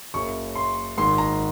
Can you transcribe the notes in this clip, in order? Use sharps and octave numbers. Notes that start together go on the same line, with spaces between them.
F#1 F#2 C#3 C#6
C6
G#1 G#2 D#3 C6
A#5